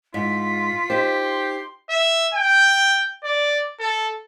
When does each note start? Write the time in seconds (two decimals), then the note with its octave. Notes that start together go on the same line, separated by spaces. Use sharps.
0.14 G#2 F4 B6
0.90 D#4 G4 C5
1.23 C6
1.90 E5
2.34 G5
3.24 D5
3.79 A4